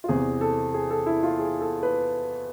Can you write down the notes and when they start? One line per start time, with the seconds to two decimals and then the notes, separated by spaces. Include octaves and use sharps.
0.04 F4
0.08 E2 C3 E3 G#4
0.41 A4
0.74 G#4
0.90 A4
1.06 E4
1.23 F4
1.39 G#4
1.61 A4
1.83 B4